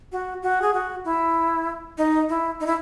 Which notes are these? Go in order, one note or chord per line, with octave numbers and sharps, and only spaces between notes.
F#4
F#4
G#4
F#4
E4
D#4
E4
D#4
E4